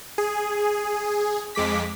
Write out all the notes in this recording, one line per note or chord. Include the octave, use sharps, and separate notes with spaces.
G#4
F2 G#3 D6 B6